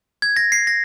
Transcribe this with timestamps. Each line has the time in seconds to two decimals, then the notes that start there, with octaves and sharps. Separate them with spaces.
0.22 G#6
0.37 A#6
0.52 C7
0.67 A#6